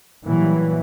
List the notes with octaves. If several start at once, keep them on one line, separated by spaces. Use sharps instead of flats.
A#2 E3 F#3 G3